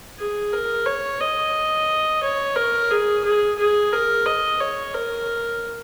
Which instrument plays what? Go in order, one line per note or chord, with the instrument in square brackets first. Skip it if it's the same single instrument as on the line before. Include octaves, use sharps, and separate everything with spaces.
[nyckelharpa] G#4
A#4
C#5
D#5
C#5
A#4
G#4
G#4
G#4
A#4
D#5
C#5
A#4